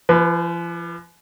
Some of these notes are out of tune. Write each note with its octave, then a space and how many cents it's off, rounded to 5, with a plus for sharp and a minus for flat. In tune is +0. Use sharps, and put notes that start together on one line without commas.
F3 -40 B4 +0